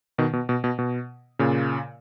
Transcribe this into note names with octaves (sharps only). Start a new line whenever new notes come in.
B2 D#3
B2
B2
B2
B2
A#2 C#3